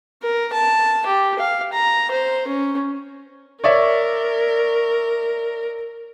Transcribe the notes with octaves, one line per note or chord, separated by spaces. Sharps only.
A#4
A5
G4
F5
A#5
C5
C#4
A#4 C#5 D5 E5